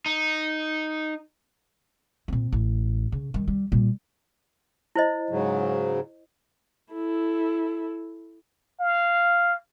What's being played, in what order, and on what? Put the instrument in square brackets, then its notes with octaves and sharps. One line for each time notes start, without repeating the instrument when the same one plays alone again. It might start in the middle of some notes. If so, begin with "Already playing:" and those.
[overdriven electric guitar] D#4
[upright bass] A#2 C4
A1
C#3
D#3 G3
G3
A#2 G3
[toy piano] E4 C5 D#5
[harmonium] G#2 C#3 F#3
[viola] E4 A4
[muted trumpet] F5